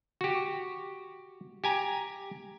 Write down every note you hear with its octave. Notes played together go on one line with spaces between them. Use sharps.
F#4 G4
G4 G#5 A#5